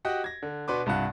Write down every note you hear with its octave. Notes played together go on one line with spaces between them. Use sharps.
F#4 G4 D#5 F#5
G#6 A#6
D3
B2 B3 D4 B4 C6 D6
C2 G2 F4 F#5